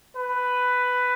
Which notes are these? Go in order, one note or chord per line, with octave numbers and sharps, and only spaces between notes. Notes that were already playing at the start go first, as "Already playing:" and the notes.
B4